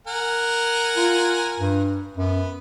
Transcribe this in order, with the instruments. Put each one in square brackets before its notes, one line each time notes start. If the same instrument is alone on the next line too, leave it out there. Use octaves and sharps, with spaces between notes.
[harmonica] A#4 F#5 G#5
[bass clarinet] F4
G2
[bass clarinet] F#2 [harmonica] B3